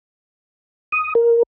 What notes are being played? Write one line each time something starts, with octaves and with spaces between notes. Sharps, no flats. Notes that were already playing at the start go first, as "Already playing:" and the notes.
D#6
A#4